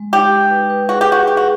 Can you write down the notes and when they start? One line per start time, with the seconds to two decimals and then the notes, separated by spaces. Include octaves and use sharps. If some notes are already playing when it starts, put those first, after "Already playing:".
Already playing: G#3
0.13 D#4 G4
0.32 D#4
0.50 B4
0.70 B4
0.89 F#4 G#4
1.01 G4
1.09 F#4 G#4
1.27 G4 G#4
1.37 F#4